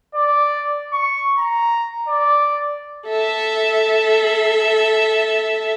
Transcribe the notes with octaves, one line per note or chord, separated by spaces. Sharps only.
D5
C#6
A#5
D5
A4 E5